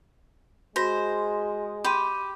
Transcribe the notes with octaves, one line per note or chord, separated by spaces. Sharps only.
G#3 F#4 C5 A#6
G4 B5 C6 D#7